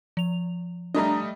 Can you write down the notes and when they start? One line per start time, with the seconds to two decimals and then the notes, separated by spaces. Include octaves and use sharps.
0.17 F3 F7
0.95 G3 A3 D4 D#5 A#5